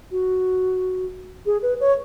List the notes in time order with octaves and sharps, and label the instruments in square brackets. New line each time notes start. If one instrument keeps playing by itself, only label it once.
[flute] F#4
G#4
B4
C#5